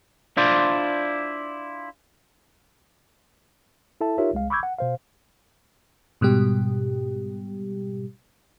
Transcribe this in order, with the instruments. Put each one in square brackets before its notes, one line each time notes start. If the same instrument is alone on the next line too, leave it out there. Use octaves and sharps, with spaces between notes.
[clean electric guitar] D4 E4 F4 C5 D5
[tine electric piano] E4 A4 E5 A5
D#4 F4 G4 A#4 C#5 E5
C2 G#3 F5
B5 C#6 D6 E6 G6 G#6
F#5
B2 C5 F5
[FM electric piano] G#2 B2 G3 G4